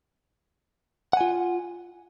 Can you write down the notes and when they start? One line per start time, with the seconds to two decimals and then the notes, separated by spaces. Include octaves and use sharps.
1.13 F#5
1.17 G#5
1.21 F4